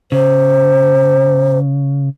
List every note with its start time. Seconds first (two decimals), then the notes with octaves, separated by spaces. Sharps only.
0.12 C#3 C5